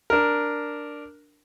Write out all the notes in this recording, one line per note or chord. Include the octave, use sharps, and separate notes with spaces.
D4 A#4